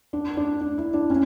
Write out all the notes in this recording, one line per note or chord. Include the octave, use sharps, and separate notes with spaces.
D4
D4
D4
E4
D4
C#4